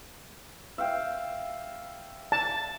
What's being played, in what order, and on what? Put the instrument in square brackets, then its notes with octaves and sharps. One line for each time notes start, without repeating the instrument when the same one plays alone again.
[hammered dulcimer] E5 F5 G5
[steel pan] A5